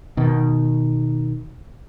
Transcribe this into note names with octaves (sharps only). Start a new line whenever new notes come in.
B2 D#3